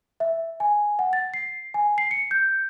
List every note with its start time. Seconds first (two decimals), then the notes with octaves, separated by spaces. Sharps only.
0.20 E5
0.60 G#5
0.99 F#5
1.13 A6
1.34 C7
1.74 G#5
1.98 C7
2.11 C#7
2.31 G6